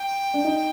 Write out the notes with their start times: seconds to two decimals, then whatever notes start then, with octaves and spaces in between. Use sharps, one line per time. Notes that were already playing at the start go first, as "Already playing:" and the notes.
Already playing: G5
0.34 D4
0.44 D#4